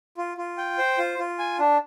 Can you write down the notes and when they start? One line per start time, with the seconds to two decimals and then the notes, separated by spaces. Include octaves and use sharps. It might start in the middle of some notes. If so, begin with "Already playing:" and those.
0.18 F4
0.37 F4
0.58 G5
0.78 C5
0.98 F4
1.19 F4
1.39 G#5
1.59 D4